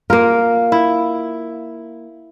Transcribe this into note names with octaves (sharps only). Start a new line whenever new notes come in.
A#3 F4 A#4
E4